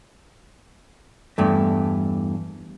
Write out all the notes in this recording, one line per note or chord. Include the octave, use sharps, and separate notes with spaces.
E2 G2 A3